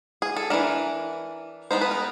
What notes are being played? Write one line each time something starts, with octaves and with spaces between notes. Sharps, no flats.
G#4
A4
E3 A3 D4 A#4
G#3 B3 D#4 C5
B4
A#4